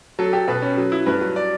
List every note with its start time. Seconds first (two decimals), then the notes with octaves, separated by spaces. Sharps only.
0.19 F#3 A4
0.33 G4 A4
0.48 B2 B4
0.62 C#4
0.77 F#3
0.92 E4
1.06 G2 B4
1.21 F#3
1.36 D5